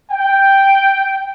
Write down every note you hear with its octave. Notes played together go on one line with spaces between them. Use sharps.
G5